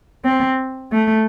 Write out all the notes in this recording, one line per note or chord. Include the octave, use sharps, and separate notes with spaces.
C4
A3